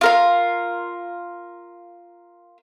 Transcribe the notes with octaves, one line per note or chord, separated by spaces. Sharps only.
F4 A#4 F5